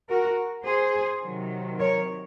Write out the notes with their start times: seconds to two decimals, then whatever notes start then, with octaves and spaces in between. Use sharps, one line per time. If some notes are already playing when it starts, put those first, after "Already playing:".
0.09 F#4 A#4
0.65 G#4 C5
1.22 C3 D#3 F#3
1.79 A#4 C#5